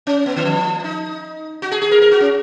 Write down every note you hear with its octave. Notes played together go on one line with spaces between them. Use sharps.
C#4
B3
D#3
F3
D#4
F#4
G#4
G#4
A#4
A#4
F#4
C#4